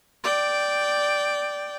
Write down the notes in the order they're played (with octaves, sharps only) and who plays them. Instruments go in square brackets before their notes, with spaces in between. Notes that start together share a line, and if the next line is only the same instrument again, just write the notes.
[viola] D5 G5